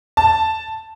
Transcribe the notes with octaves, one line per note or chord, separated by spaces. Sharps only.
A5